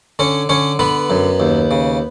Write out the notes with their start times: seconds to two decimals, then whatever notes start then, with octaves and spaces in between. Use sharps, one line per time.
0.19 D3 C#4 C#5
0.49 D3 C#4 C#5
0.79 D3 B3 B4
1.10 F#2
1.40 D#2
1.71 C#3